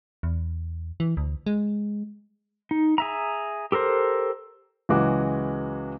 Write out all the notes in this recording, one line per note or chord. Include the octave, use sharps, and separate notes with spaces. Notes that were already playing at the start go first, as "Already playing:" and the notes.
E2
E3
D2
G#3
D#4
G#4 E5 A#5
G4 A4 A#4 C5
C#2 E3 F#3 G#3 F#4 D6